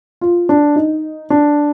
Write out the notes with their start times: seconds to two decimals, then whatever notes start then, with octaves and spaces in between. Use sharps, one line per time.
0.21 F4
0.49 D4
0.76 D#4
1.30 D4